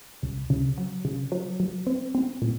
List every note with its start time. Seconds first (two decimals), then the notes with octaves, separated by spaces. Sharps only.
0.23 C#2
0.50 C#3
0.78 F#3
1.05 C#3
1.32 F#3
1.60 F#3
1.87 C4
2.15 C4
2.42 A#2